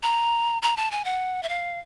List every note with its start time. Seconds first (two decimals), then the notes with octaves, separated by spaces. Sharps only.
0.03 A#5
0.62 A#5
0.77 A5
0.91 G#5
1.05 F#5
1.43 E5
1.49 F5